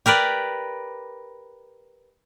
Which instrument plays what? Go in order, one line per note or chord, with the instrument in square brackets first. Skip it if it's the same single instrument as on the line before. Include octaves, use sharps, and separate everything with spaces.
[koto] G4 A#4 B4 D5